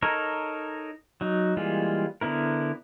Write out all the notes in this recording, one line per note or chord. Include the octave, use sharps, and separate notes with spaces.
D#4 A4 A#4 C#5
F#3 D#4
E3 G3 G#3 A#3 F4
D3 B3 E4 A#4